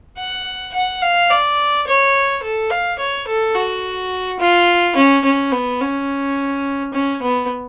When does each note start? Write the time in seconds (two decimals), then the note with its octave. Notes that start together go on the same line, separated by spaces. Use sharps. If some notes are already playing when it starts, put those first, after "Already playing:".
0.17 F#5
0.74 F#5
1.02 F5
1.30 D5
1.87 C#5
2.43 A4
2.70 F5
2.99 C#5
3.27 A4
3.55 F#4
4.39 F4
4.96 C#4
5.24 C#4
5.52 B3
5.81 C#4
6.93 C#4
7.22 B3